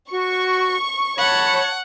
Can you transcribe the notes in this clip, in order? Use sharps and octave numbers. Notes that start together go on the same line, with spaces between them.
F#4 C#6
C#5 F#5 A5 B5